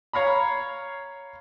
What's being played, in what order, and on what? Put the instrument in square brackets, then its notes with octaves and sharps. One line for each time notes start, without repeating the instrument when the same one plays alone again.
[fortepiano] C#5 F5 A#5 B5